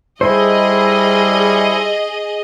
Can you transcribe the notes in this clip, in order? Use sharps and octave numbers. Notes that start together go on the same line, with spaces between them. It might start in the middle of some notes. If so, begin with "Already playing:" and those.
G3 E4 G#4 A4 C5 D#5 C6